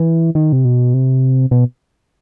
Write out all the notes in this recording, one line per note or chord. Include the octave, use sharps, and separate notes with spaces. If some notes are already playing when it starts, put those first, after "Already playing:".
Already playing: E3
D#3
C3
B2
C3
B2